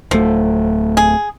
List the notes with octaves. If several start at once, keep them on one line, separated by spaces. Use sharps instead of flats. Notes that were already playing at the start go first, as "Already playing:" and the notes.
D1 F3 A3
G#4